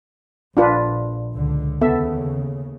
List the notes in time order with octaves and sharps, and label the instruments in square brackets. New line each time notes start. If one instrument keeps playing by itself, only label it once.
[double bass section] A#1 [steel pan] D4 F4 B4
[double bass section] C#2 D3
[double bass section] D#2 C#3 [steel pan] B3 A4 E5